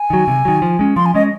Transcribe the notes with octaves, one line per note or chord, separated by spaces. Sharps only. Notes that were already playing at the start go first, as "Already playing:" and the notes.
Already playing: G#5
D#3 F#3
C3
D#3 F#3
F3
G#3 C#4
F3 C6
G#5
G#3 C#4 D#5